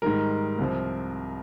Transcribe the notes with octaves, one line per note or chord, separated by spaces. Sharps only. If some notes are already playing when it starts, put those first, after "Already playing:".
G#2 D#3 G3 A#4
C2 C3 F3